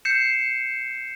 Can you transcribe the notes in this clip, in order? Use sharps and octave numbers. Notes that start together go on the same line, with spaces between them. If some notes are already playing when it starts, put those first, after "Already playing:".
G6 C7 C#7 E7